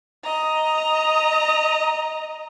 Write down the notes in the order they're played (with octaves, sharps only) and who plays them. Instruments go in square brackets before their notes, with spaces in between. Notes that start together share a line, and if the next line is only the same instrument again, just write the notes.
[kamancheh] D#5 A#5